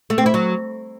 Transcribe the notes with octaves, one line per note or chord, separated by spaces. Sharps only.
A3
C4
E4
F#3